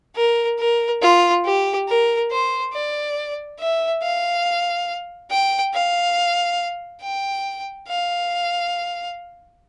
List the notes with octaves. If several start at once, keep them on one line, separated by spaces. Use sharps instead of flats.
A#4
A#4
F4
G4
A#4
C5
D5
E5
F5
G5
F5
G5
F5